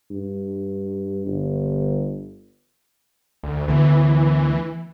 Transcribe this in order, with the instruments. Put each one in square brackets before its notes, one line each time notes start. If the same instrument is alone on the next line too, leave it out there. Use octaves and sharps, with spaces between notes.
[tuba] G2
G1
[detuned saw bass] D2
[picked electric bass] D2 D3 B3 [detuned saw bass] E3